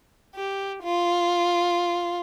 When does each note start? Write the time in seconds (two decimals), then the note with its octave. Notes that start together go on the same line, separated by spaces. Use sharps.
0.35 G4
0.84 F4